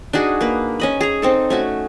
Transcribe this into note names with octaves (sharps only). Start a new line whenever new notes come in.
D4 D#4 F#4 G#4
A#3 B4
C#4 D#5 B5
G#4 A#5
C4 D#4 A4
A3 C#4 F#4